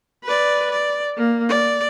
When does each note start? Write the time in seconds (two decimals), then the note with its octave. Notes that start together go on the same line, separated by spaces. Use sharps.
0.24 B4 D5
0.71 D5
1.17 A#3
1.49 D5